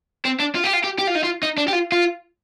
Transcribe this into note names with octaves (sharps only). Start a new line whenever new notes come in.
C4
D4
F4
G4
F4
G4
G4
F4
D#4
F4
D#4
D4
G4
F4
F4